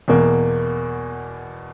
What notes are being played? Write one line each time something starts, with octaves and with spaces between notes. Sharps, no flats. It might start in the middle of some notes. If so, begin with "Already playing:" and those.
E2 B2 A#3